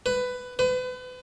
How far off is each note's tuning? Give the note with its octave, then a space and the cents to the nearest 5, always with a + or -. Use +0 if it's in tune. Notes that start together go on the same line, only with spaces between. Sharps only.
B4 +15
B4 +35